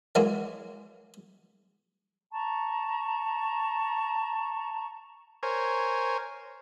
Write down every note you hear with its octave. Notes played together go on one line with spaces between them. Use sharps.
E3 F#3 G#3 A#3 B3
A5 A#5 C#6
A#4 C5 C#5 G#5